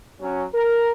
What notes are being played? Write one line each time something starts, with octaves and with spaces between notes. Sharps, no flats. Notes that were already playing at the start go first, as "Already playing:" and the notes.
F#3 C#4
A#4